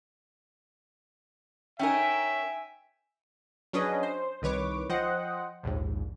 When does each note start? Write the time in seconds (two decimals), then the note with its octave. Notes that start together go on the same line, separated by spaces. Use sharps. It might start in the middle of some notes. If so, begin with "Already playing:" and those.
1.79 C#4 D#4 A#4 E5 G5 G#5
3.73 F#3 C#4 D4 G#4 B4 D#5
4.03 C5
4.42 C2 D#3 B4 C#5 D6
4.89 F3 C5 D#5 F#5 G5
5.63 A#1 D#2 G#2